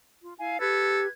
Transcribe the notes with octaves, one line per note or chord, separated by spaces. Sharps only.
F4
E4 F5 G#5
G4 A4 B4 G#6